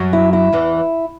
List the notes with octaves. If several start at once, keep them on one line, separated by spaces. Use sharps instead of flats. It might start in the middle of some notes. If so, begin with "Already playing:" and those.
Already playing: F#2 F#3
E4
E4
E2 E3